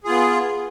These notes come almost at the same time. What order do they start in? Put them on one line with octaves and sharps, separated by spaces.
G#4 F4 B3